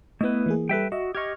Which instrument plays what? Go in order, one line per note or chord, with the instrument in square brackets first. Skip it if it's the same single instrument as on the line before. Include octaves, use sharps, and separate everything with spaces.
[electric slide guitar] A3 E4 B4 [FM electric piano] B3 D#5
[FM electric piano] E3 A#3 G#4
[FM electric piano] G3 A4 [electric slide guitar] B4 E5 G5
[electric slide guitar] F#4 [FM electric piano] D#5 E5
[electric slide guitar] G4 D#5 [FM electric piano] C#6 F6 G#6